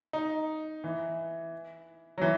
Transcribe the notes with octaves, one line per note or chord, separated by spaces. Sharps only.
D#4
E3
F#3
E3